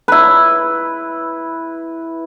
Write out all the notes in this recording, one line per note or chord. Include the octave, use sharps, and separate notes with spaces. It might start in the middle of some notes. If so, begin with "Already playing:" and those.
E4 B4